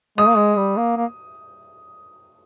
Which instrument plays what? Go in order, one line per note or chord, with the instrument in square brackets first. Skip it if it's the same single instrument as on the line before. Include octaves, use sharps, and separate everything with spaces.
[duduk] G#3 [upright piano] D#6
[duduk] A#3
G#3
G3
A#3
A#3